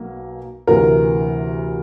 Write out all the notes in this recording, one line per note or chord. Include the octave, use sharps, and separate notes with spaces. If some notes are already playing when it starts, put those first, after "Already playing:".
Already playing: B1 B2 A#3
D2 C3 E3 A#4